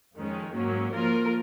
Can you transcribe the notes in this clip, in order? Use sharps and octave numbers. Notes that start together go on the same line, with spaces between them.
F2 D#3 G#3 C#4
G#2 F#3 A#3 C#4
F3 A#3 F4 A#4